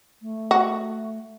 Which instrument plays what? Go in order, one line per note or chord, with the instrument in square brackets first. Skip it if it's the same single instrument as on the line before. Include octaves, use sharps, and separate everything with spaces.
[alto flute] A3
[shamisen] F#4